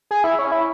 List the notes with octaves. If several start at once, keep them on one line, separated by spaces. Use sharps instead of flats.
G#4
E4
C#4
E4